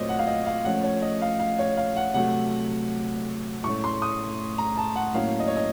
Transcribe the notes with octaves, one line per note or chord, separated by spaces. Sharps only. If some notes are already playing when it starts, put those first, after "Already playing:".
Already playing: A#2 F#3 A3 C4 C5 C#5 D#5
F#5
F5
D#5
F5
F3 A3 C#4 F#5
C#5
D#5
F5
F5
C#5
F5
F#5
C3 F#3 A3 F#5
A2 A3 C#4 C#6
C6
D#6
A#5
A5
F#5
A2 F#3 A#3 C#4 F5
D#5
C#5
D#5